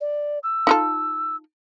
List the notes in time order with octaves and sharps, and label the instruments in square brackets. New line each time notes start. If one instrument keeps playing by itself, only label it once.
[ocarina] D5
E6
[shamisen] D#4 F4 A4